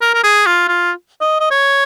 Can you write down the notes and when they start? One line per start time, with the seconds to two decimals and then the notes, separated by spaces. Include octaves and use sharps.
0.01 A#4
0.14 A#4
0.23 G#4
0.47 F4
0.68 F4
1.21 D#5
1.40 D#5
1.51 C#5